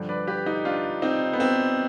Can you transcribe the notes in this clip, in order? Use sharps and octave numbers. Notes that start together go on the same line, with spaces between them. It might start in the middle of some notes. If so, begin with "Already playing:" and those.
Already playing: G2 D3 F3
B4 D5
G4 B4
D#4 G4
D4 F4
C4 D#4
B3
C4